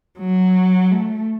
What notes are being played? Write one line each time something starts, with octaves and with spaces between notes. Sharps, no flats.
F#3
A3